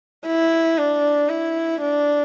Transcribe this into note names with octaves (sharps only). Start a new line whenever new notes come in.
E4
D4
E4
D4